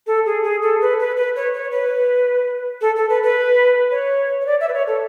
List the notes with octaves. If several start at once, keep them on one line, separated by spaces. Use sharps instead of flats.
A4
G#4
G#4
A4
B4
B4
B4
C#5
C#5
B4
A4
A4
B4
B4
C#5
C#5
D5
E5
B4
C#5
A4